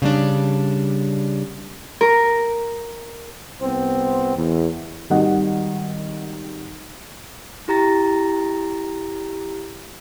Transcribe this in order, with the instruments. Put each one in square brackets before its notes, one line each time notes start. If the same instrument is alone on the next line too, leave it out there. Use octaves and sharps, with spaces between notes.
[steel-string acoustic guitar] C#3 G3 D4
[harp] A#4
[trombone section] C2 B3 C4 C5
E2
[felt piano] G#1 D#3 G3 F#4 D#5 F#5
[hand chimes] E4 G4 A#5 A6 A#6